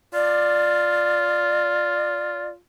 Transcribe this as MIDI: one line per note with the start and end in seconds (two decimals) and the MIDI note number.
0.14 2.57 65
0.14 2.48 74